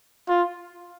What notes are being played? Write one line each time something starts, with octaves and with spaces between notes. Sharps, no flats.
F4